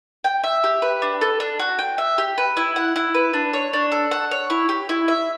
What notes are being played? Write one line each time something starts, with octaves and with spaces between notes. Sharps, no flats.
G5
E5
G4
B4
D4
A4
D4
F#4
G5
E5
G4
B4
E4
F#5
E4
B4
D4
C#5
D4
A4
F#5
C#5
E4
G4
E4
E5